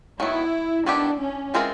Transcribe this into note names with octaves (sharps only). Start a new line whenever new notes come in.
D#3 F#3 B3 E4
D#3 G3 B3 D4 E4 G4
C#4
E3 G#3 C4 F4 A#4